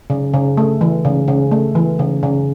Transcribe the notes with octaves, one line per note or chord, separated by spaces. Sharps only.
C#3
C#3
A3
E3
C#3
C#3
A3
E3
C#3
C#3